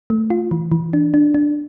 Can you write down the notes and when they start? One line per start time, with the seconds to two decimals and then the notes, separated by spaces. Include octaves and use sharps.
0.10 A3
0.30 F4
0.51 E3
0.72 E3
0.93 D4
1.14 D4
1.34 D4